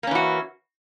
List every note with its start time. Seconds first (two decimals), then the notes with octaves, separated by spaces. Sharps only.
0.03 A#3
0.07 C#4
0.11 E3
0.15 F#4